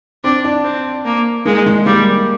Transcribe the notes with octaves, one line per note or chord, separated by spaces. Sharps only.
C4 D4
D4
C4
A#3
G#3 A#3
G#3
G3 A#3